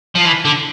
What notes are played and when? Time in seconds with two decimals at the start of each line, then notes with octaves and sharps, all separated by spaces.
0.15 F3
0.25 E3
0.45 D3